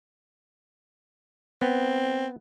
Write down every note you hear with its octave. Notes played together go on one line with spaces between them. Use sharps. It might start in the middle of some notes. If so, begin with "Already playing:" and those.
B3 C4